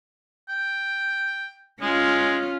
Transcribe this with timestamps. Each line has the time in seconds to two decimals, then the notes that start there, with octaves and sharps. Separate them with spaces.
0.49 G5
1.82 G#3 C#4 F4